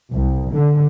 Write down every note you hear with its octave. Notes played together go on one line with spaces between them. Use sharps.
C2
D3